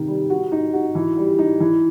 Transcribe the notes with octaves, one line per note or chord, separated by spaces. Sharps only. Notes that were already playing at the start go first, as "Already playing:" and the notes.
Already playing: C3 D#3
G3
F#4
D#4
F#4
E3
G3
D#4
E3